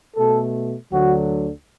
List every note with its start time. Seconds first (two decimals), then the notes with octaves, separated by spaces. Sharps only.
0.15 B2 A3 A4
0.90 D2 D3 F#3 F#4